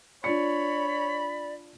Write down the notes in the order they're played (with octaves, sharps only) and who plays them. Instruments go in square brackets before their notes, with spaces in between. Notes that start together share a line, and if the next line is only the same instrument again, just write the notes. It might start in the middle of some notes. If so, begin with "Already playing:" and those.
[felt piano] D4 F4 C#7 [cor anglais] C#5 [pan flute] D5 [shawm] B5